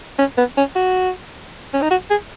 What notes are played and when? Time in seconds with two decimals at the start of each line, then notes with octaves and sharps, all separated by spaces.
0.19 C#4
0.38 B3
0.58 C#4
0.76 F#4
1.74 C#4
1.82 D#4
1.91 F#4
2.10 G#4